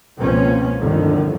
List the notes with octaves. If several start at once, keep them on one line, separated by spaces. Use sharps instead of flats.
C#2 B2 F3 A#3 C4 C#4
G1 F2 A2 D3 D#3